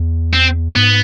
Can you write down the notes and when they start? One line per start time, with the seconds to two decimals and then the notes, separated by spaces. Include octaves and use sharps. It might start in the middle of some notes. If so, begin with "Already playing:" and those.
Already playing: E2
0.33 C4
0.76 G#2 B3